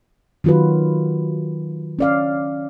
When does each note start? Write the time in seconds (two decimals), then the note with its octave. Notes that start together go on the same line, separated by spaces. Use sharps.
0.44 D#3 F#3 F4 F#4 B4
1.99 C#4 D5 F5